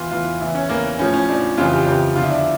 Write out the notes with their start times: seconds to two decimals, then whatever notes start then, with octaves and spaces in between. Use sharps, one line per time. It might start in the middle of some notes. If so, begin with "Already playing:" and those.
Already playing: E2 E3 F4
0.11 E2 E3 F4
0.40 E2 E3 E4
0.55 C#4
0.69 E2 E3 A#3
0.99 A2 F3 C#4
1.14 C#4
1.28 A2 F3 D4
1.57 F2 C#3 E3 F4
1.72 G4
1.87 F2 C#3 E3 G4
2.15 E2 D3 F3 F4
2.23 E4
2.30 D4
2.38 E4